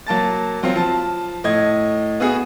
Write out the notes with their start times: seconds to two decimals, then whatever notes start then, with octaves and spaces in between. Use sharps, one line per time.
0.07 F#3 A#3 A5 A6
0.63 F#3 C4 F4
0.76 F3 A5
1.44 A2 D#5 G#6
2.20 B3 F#4 G#4